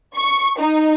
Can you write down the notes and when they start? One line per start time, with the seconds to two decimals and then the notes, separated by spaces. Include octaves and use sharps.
0.16 C#6
0.59 D#4